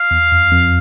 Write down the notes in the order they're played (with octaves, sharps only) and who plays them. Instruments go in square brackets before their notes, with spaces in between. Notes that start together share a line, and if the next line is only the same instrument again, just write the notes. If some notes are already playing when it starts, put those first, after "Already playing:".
Already playing: [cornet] F5
[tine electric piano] E2
F2
F2